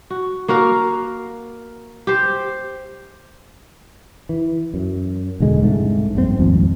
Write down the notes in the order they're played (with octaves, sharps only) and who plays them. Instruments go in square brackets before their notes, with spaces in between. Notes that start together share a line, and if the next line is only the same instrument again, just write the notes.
[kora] F#4
A#3 F#4 A#4 F5
G4 C5
[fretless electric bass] E3
F#2
E1 D3 G#3
C2 G#2 A3
A#1 G2 F3 C4
D#1 G#1 F2